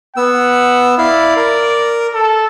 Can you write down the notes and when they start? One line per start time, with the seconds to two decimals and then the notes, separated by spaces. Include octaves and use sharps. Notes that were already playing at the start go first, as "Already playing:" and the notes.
0.17 B3 F#5 E6
0.98 E4 D5 F5
1.37 A#4
2.14 A4